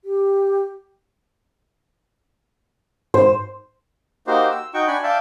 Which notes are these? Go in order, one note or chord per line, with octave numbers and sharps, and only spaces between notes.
G4
G#2 C5
A#3 D#4 F#4 G4 C5
E6
D#4 F#4 G5 C#6
D4 G#5 B5 C#6
D5 E5 F5 G5 A5